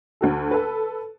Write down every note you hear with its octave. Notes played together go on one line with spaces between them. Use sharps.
D2 F#4 A4
A4 B4